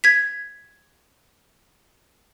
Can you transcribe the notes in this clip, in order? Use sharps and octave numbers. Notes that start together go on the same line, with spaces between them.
G#6 B6